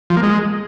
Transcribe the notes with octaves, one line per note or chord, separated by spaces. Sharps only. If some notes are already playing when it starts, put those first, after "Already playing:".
F3
A#3
G#3